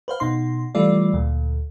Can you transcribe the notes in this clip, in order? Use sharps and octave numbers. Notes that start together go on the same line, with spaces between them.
B4 C5 F5
B2 D#4 C6
E3 G3 A3 F4 D5
D2 A#2